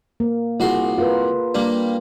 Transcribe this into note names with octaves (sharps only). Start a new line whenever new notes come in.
A#3
C2 F4 F#4 G#4 C6
F4 A#4 B4
G3 A#3 D4